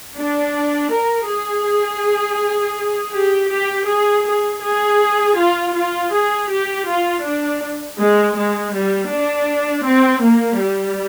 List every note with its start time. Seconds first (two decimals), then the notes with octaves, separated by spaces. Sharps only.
0.15 D4
0.90 A#4
1.27 G#4
3.14 G4
3.52 G4
3.89 G#4
4.26 G#4
4.63 G#4
5.38 F4
5.76 F4
6.13 G#4
6.50 G4
6.88 F4
7.25 D4
7.99 G#3
8.37 G#3
8.74 G3
9.12 D4
9.86 C4
10.24 A#3
10.61 G3